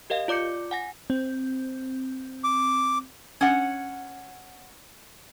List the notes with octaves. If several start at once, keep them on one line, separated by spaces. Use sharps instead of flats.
G4 A#4 D#5 F5
F4 D5 D6 G6 C#7
F#5 G#5 A#6
C4
D6
C#4 F#5